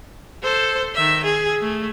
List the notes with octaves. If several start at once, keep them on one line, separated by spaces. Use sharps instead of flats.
A4 C5
D#3 E5
G#4
A3